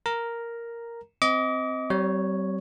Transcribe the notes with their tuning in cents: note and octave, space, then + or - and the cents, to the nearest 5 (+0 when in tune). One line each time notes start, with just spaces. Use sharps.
A#4 +0 A#5 +0
C4 -5 D#5 +20 D6 -30
G3 -40 C4 -10 C#5 +0